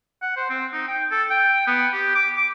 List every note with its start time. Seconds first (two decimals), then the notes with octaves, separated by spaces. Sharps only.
0.22 F#5
0.36 C5
0.50 C4
0.73 D#4
0.88 G5
1.11 A4
1.30 G5
1.67 B3
1.93 G4
2.15 D6
2.37 D6